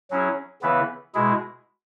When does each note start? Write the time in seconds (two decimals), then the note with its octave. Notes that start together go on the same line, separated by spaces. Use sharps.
0.11 F#3 C#4 E4 G#4
0.62 C#3 E3 B3 E4 B4
1.15 B2 G#3 E4 G#4